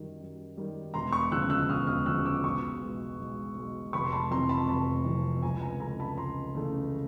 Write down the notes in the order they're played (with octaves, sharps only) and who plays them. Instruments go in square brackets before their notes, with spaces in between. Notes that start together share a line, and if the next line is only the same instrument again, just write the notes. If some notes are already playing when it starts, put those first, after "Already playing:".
Already playing: [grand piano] F#2 D#3 G3
F#2
D#3 G3
E1 A#5 C6
B5 C#6
D2 C#3 F3 E6 F#6
E6 F#6
E1 D#6 F6
D#6 F6
D2 C#3 F3 E6 F#6
D6 E6
B1 C#6 D#6
B2 G#3
B1
B2 G#3
F1 B5 C#6
C6
A5 B5
F2 C3 E3 A#5 C6
A5 B5
F1 A5 B5
F2 C3 E3
C#2 G#5 A#5
G#5 A#5
C#3 E3 A3 G#5 A#5
A5 B5
C#2 A#5 C6
C#3 E3 A3